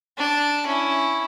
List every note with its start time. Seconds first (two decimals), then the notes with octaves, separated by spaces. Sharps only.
0.18 D4 A5
0.66 C#4 E4